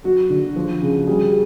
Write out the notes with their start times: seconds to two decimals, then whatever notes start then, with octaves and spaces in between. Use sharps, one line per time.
0.04 F#3 F#4
0.30 D3
0.56 F3
0.82 C#3
1.07 G3 F#4 G#4